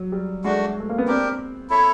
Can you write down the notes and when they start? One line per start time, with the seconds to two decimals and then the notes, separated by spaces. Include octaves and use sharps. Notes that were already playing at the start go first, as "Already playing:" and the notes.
Already playing: F#3
0.12 G3
0.44 G#3 A3 D4 F#4
0.80 A3
0.89 A#3
0.98 B3
1.07 C4 D4 G4 A#4
1.70 E4 A4 C#5 E5